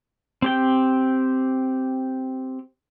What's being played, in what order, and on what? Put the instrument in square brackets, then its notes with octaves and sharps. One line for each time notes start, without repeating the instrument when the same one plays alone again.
[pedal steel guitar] C4 G4 G5